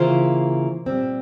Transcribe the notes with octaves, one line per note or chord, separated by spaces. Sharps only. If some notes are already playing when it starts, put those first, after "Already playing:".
Already playing: C#3 E3 A#3 F4 C5
A#2 G3 C4